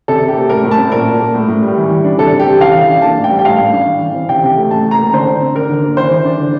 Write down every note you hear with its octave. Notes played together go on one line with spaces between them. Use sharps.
C3 A4
C3
G4
A#3
A2 A#4
A2
A5
C4
A#2 A#4
A#2
A#3
A2
A2
G3
E3
E3
D4
C3 A4
C3
G4
C4
E3 F5
E3
D4
A#3 A5
A2
G5
G3
G5
A2 F5
A2
D4
E3
E3
C4
C3 G5
C3
A3
A2 A5
A2
A#5
A#3
D3 C5
D3
C4
D4 A#4
D3
A#3
E3 C5
E3
D4
D3